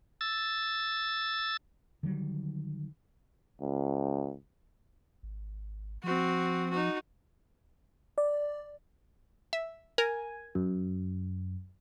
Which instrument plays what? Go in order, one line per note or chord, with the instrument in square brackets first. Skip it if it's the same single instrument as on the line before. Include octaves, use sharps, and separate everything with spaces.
[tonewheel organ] E6 A6
[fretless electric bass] D3 D#3 F#3 G3
[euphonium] C#2
[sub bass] G#1
[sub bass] F3 [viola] C4 F#4
[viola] D#4 F#4
[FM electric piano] D5
[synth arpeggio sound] E5
[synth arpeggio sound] A#4 [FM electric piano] G#5
[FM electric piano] F#2